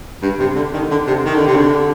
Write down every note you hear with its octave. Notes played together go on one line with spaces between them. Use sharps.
G2
C3
D3
D#3
D3
C3
D#3
D3
C3
D3